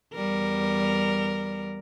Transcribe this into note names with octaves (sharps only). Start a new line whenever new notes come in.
E2 G3 A#4